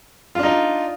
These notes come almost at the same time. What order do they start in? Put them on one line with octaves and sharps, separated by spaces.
F4 D4 D#4